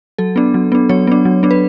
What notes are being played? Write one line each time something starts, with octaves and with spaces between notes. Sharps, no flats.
F#3 A4
B3 D4
F#3
B3 D4
F#3 C#5
B3 D4
F#3
B3 D4
B4